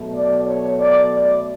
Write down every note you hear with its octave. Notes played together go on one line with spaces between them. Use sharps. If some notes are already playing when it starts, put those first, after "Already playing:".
Already playing: B2 F#3 A3
D5
C#5
D5
D5